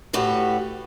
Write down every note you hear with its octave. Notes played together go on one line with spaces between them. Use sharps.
A2 F#4 G4 B4